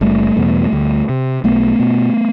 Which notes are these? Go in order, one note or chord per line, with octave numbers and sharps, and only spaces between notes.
F#1 G3 A3
E2 B2
D2
C3
B1 A3 B3
B2